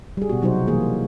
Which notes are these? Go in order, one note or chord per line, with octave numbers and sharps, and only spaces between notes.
G3 G#4
B2 B3 F#4
C3 F#3 D#4 F4 F#4 C5
E3 G3 A#3 G#4